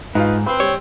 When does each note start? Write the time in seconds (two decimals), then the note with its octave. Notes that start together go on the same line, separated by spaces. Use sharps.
0.15 G#2 D#4 F4 B4 F5
0.46 C4 B4 B5 C6
0.60 G3 C#5